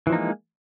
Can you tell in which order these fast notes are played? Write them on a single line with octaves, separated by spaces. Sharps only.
E3 F3 D#4 A#3 G#3